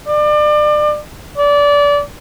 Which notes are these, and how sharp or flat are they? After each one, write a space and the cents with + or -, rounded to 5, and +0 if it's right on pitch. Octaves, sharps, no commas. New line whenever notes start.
D5 +30
D5 -25